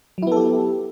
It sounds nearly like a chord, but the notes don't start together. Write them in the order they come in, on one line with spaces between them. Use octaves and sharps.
F#3 E4 B3 A4 G4